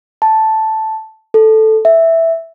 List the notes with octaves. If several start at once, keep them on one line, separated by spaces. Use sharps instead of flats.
A5
A4
E5